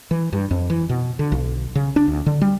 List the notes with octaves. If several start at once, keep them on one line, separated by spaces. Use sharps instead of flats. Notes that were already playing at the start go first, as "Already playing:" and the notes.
E3
G2
F2
E3
B2
D3
B1
C#3
D4
D2
D3
G3